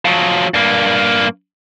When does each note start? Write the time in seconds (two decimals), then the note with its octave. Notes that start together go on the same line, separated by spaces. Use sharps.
0.05 F3 F#3
0.54 G2 A#3